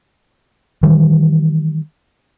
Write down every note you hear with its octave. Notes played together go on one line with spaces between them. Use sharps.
D#3 E3 G3